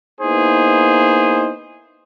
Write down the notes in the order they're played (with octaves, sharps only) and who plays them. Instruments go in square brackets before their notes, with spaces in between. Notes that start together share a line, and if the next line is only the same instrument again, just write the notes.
[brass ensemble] A#3 B3 D#4 E4 G#4 C5